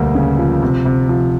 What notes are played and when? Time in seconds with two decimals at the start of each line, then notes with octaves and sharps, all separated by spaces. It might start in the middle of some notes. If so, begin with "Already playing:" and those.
Already playing: D2 B2 G3 A#3
0.15 C#3
0.38 F3
0.62 C3
0.85 C3
1.09 F3